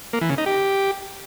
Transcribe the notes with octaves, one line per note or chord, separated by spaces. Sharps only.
A#3
E3
C#3
D#4
G4